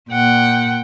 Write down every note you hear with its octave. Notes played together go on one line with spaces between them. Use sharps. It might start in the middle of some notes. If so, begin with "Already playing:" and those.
A#2 F#5 G5